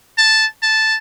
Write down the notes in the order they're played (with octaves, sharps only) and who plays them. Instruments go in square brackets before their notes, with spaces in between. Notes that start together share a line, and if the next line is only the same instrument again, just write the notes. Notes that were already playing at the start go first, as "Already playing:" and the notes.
[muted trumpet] A5
A5